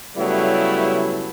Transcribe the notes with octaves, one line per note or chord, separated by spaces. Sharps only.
C#3 F#3 G3 A3 B3 E4